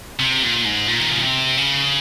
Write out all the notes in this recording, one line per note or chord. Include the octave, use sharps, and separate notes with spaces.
C3
A#2
G#2
A#2
D#3
C#3
C3
C#3